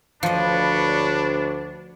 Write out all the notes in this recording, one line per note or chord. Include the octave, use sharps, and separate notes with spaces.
D2 F3 D4 B4 C#5 D#5